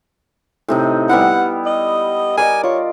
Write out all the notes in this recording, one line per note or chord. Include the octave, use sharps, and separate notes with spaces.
A2 C3 D#4
G3 B3 E4 F#5
D#5
A#4 D5 D#5 G#5
F4 C#5